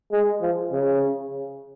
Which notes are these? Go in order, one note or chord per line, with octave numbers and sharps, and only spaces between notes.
G#3
F3
C#3